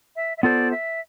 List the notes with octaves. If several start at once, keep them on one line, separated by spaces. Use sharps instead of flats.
E5
E5
B3 F4 A4 C5 D5
E5